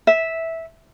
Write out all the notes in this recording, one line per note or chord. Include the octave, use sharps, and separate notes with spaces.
E5